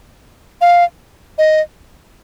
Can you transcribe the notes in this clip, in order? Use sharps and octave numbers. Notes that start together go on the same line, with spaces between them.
F5
D#5